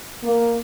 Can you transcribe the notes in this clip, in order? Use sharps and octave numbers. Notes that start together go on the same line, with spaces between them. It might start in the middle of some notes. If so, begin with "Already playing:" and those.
A#3